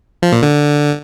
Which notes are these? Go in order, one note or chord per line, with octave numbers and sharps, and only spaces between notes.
F3
A#2
D3